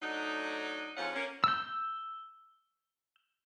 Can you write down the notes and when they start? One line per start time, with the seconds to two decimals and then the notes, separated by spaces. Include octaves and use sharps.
0.02 F#3 A3 D4 D#4
0.97 F2 G#2 F3 C#4 F4 F#5
1.15 A#3 C#4
1.44 E6 G6